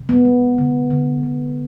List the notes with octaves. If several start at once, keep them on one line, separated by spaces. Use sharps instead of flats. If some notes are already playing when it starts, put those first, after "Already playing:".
Already playing: C3
B3
G#3
D3
D3
D3